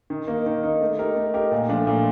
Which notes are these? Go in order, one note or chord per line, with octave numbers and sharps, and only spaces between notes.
D#3
A#3 D#4
D#3
A#3 D#4
A3
D#4 G4 A#4
A3
D#4 G4 A#4
A#2
F3 A3 D4
A#2